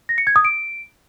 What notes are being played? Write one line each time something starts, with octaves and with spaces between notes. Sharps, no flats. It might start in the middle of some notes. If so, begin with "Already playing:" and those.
A#6
C#7
G#6
D#6
D7